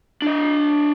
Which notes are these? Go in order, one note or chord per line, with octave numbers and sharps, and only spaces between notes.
D4 D#5